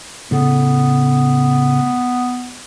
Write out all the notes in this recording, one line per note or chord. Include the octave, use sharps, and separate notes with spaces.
A2 C#3 B3 A4